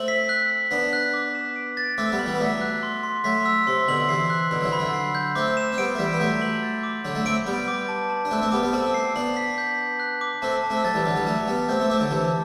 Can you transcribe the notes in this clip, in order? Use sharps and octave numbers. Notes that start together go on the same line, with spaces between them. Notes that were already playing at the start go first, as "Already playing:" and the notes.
Already playing: A3 C4 F#7
B6
F#6
F#6
B3 D4 B6
F#6
D6
E7
D7
A6
A3 C4 D6
G3 B3
F#7
E3 G3
B3
F#3 A3 B6
F#6
C6
C6
F#3 A3 B6
E6
C3 C6
B2 D3 F#7
C3 E3 C7
F#6
B2 D3 B5
F#3
C3 E3
B5
D3 F#3
C7
G6
A3 C4 D6
E7
C4
G3 B3 D7
A3
E3 G3 B6
B3
F#3 A3 G6
F#7
A6
D6
D3 F#3 B5
F#3 A3
A3 C4 D7
G3 B3 G6
D6
A5
A5
D4
A3 C4 F#6
A3 C4
G3 B3 D6
G3 B3
A3 C4 A5
C7
B3 D4 F#7
B6
G6
G6
F#6
D6
A3 C4 A5
A5
A3 C4
F#3 A3 A6
E3 G3
D3 F#3 D6
E3 G3
F#3 A3 A5
G3 B3 A5
A3 C4 G6
A3 C4
A3 C4 D6
D3 F#3
C3 E3 A5